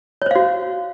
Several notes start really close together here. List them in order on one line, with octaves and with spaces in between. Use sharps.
C#5 C5 F5 F#4